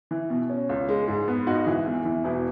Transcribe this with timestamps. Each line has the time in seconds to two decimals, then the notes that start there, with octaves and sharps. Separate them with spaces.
0.11 E3
0.30 B2
0.50 C#4
0.69 C#2
0.89 G#3
1.08 G#2
1.28 B3
1.47 G#1 D#4 F#4
1.67 E3
1.86 E2
2.05 E3
2.24 E1 E4